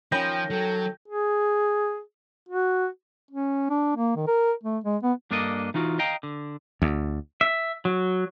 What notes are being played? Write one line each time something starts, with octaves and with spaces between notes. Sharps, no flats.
D#3 F3 C#4 G5 B5 G6 A#6
F#3 A4
G#4
F#4
C#4
D4
A#3
D#3
A#4
A3
G#3
B3
G2 A#3 D4 A4 D#5
E3 D#4 F4 F#4
D#5 F5 G5 A#5
D3
D2
E5
F#3